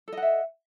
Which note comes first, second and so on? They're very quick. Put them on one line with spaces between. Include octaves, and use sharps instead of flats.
A4 D#5 F#5 E5